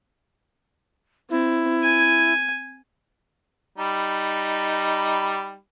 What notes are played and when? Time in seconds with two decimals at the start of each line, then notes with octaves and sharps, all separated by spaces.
1.30 C4 E4
1.83 G#5
3.78 G3 D#4 B5